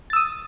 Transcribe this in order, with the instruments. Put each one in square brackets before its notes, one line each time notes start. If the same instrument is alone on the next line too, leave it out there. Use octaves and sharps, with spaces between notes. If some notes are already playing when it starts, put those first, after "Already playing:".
[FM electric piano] A6
E6
D#6